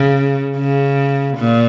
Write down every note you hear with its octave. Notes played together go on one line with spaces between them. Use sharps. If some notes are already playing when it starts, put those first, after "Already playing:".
Already playing: C#3
C#3
A#2